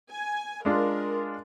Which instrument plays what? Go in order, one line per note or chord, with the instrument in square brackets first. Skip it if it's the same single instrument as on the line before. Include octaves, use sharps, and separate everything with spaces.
[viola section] G#5
[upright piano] G#3 D4 F4 [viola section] A#4